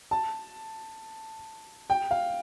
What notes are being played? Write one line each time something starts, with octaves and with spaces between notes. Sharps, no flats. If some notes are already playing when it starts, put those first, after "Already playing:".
A5
G5
F5